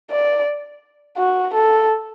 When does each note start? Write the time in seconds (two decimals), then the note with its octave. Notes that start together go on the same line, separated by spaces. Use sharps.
0.11 D5
1.17 F#4
1.54 A4